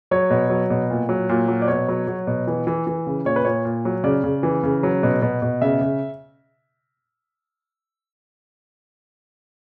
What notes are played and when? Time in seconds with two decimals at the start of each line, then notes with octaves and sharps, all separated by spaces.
0.11 F#3 C#5
0.30 B2
0.50 F#3
0.70 B2
0.90 A#2
1.09 F#3
1.29 A#2
1.48 F#3
1.62 D5
1.68 B2 C#5
1.89 F#3
2.07 F#3
2.27 B2
2.47 E3
2.67 E3
2.87 E3
3.06 C#3
3.25 A#2 C#5
3.36 B4
3.45 A#2 C#5
3.65 A#2
3.85 F#3
4.04 C#3 D5
4.24 C#3
4.43 E3
4.63 C#3
4.83 F#3
5.03 B2
5.22 B2
5.42 B2
5.62 C#3 E5
5.81 C#3